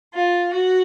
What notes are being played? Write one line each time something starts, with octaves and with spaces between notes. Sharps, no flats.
F4
F#4